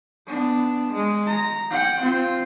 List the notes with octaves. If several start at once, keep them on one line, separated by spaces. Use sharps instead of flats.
B3 D4
G#3
A#5
F#5 G5
C4 F4